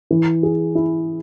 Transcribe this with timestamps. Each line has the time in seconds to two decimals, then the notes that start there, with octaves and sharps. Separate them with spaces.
0.11 E3
0.43 G#4
0.75 E4